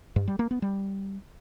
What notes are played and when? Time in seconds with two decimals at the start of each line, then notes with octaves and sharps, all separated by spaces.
0.16 G2
0.28 G3
0.39 A#3
0.51 B3
0.62 G3